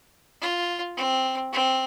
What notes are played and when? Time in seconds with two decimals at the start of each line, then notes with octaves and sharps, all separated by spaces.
0.41 F4
0.97 C4
1.53 C4